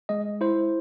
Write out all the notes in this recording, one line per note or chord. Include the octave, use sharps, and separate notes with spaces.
G#3 D#5
E4 C5